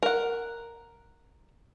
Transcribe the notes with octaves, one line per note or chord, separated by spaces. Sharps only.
A#4 F#5